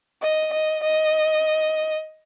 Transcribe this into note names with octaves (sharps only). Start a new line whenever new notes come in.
D#5
D#5
D#5